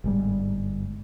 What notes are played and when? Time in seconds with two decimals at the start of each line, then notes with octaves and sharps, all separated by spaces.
0.04 G1 G#2 G3